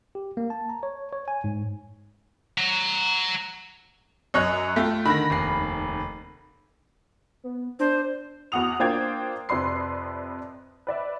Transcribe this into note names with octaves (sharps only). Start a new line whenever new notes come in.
G4
A#3
A5
A#5
C#5
C#5
G#5
G#2
F#5 A#5
F#2 C#5 D#5 F#6
A3 F4 G5
D3 D#3 B5 A#6
F1 D#2 C7
B3
D4 C5
E2 B3 F#4 F#5 D#6 F7
A#3 D4 F4 C5 G5 G#6
F2 C3 B4 D5 C6 C7
B4 D5 E5